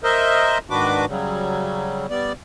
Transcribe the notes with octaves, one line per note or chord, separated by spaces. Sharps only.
A#4 C5 D#5 E5
G#2 D#3 D4 F#4 B4 D6
C#3 F#3 G3
G3 B3 D5